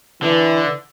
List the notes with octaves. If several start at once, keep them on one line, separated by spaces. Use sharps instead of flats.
D3 E3